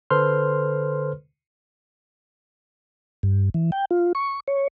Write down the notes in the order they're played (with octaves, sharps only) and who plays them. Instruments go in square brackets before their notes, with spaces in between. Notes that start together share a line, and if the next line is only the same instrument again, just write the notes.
[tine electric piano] D3 A4 B4 C5 C6 F6
[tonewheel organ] G2
E3
G5
F4
C#6
C#5